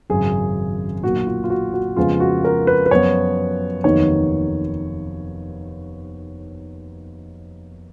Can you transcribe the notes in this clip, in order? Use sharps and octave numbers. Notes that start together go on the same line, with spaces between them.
G#1 F#2 C#3 G#4
B1 A#2 F#3 A#3 F#4
F4
F4
F#4
F#4
F2 C#3 G#3 B3 F4
F#4
A#4
B4
B4
F#2 F3 B3 C#5
F1 D#2 D#3 F#3 B3 C#5